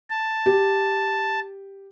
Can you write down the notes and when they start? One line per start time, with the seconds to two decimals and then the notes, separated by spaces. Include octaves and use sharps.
0.10 A5
0.46 G4